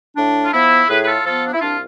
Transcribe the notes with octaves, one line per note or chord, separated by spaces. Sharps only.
A2 D4
F4
F3 B3 E4
A2 G#4 B4
B4
F4 A4
F3 B3 F4 A4
D4
E4
C2 D4 F4